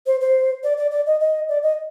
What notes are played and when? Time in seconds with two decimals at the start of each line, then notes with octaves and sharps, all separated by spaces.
0.07 C5
0.21 C5
0.64 D5
0.78 D5
0.91 D5
1.07 D#5
1.20 D#5
1.49 D5
1.63 D#5